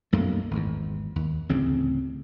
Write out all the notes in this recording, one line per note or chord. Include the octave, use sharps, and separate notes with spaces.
B1 F#2 A3 A#3
G#1 E2
D#2
A1 D2 C#3 C4